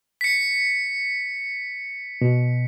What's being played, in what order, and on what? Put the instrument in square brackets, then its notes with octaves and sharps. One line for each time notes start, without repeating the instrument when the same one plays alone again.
[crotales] B6 C#7
[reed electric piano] B2